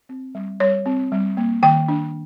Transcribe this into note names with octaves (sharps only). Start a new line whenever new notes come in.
C4
G3
G3 C#5
C4
G3
A#3
D#3 G5
D4